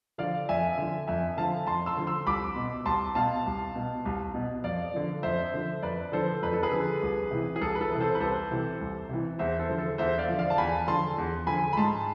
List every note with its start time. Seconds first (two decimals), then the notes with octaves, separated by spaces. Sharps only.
0.18 D3 F3 D5 F5
0.49 F2 E5 G#5
0.78 D3 F3
1.07 F2 E5 G#5
1.37 D3 F3 F5 A5
1.67 F2 A5 C6
1.86 C6 E6
1.97 D3 F3
2.07 C6 E6
2.26 C2 B5 D6
2.56 B2
2.85 C2 A5 C6
3.15 B2 F5 A5
3.46 C2
3.75 B2
4.05 C2
4.34 B2
4.64 F2 D5 F5
4.94 D3 F3
5.23 F2 C5 E5
5.54 D3 F3
5.82 F2 B4 D5
6.12 D3 F3 A4 C5
6.42 F2 B4
6.53 A4
6.63 G#4 B4
6.72 D3 F3
7.02 C2
7.31 C3 E3
7.56 G#4
7.61 C2 A4
7.75 B4
7.81 A4
7.91 C3 E3
8.00 A4 C5
8.15 B4
8.20 C2 A4 C5
8.51 C3 E3
8.81 C2
9.09 C3 E3
9.39 E2 C5 E5
9.59 A4 C5
9.70 D3 F3
9.78 A4
9.98 E2 C5 E5
10.18 D5 F5
10.28 D3 F3
10.38 D5 F5
10.50 A5
10.58 E2 G#5 B5
10.88 D3 F3 A5 C6
11.18 E2
11.47 D3 F3 G#5 B5
11.73 B5
11.77 G#2 A5 C6